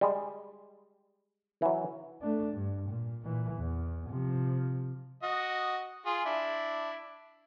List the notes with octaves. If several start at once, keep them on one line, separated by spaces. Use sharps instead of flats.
G3 G#3
E3 F#3
A3 D4
G2
A#2
A#2 E3
E2
C3 F3
F#4 D#5
F4 G#4
D4 E4